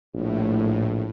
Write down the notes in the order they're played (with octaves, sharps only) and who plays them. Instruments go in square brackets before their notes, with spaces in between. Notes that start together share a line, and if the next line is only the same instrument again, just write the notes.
[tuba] A#1 [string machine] A2